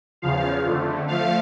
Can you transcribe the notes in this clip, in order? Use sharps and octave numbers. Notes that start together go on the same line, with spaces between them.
E2 C#3 F3 F5
F2 D3 A3
F3 A3 F5